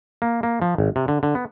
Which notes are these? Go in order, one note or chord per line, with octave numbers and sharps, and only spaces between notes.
A#3
A#3
F3
G#1
C3
D3
D3
B3